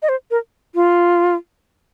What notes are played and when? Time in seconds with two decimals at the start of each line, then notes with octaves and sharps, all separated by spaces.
0.02 D#5
0.09 C5
0.31 A#4
0.75 F4